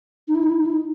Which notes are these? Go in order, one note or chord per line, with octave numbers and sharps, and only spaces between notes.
D#4
E4
D#4
E4
D#4
E4
D#4